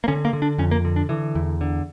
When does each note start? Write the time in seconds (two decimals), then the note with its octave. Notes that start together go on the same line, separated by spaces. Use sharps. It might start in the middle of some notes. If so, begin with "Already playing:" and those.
0.04 A#3
0.08 D3 C#4
0.25 A#3
0.33 D3
0.42 D4
0.58 F2 C#4
0.71 A#3
0.85 D3
0.96 D4
1.09 D3 E3
1.35 E2
1.61 D3